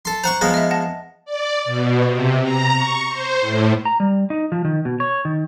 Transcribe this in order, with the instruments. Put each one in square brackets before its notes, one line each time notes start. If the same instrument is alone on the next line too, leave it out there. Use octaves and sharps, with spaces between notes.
[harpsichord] A4 C6
[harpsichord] C5 F#5 C#6 [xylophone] A#5
[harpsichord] F3 G#3 B3
[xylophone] D#5 E5
F#5 A5 A#6
[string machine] D5
B2
C3
A#5
C#6
C5
A2
[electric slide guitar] A#5
G3
D#4
F3
D#3
B2
C#5
D#3